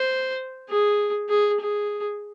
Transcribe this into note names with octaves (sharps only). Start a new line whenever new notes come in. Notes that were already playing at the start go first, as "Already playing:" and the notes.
Already playing: C5
G#4
G#4
G#4